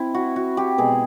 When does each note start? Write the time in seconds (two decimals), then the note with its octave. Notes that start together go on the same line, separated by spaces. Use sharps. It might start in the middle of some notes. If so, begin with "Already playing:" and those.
Already playing: C4 E4
0.14 F#4
0.36 F#4
0.57 G4
0.78 B2 G#3 B3 G#4